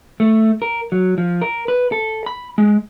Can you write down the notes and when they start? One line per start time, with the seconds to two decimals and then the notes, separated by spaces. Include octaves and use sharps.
0.20 A3
0.62 A#4
0.92 F#3
1.18 F3
1.42 A#4
1.68 B4
1.92 A4
2.26 B5
2.58 G#3